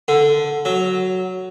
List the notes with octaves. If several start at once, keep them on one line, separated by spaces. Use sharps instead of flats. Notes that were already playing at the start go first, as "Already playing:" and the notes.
D3
F#3